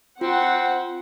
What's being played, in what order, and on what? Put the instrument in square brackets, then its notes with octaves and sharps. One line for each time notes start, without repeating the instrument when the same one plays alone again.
[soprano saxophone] C4 [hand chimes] F4 [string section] F#5